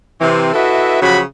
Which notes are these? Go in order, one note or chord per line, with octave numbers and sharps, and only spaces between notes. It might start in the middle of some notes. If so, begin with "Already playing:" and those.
C3 E3 C4
E4 F#4 A4 B4 D#5 E5
C#3 F3 F#3 F#4 G4 B5